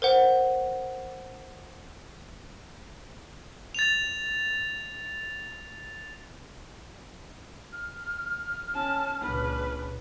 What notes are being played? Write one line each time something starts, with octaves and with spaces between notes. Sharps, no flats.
A#4 C5 F#5
A6 F7
F6
C#4 A5
C#2 A#2 C#3 D4 B4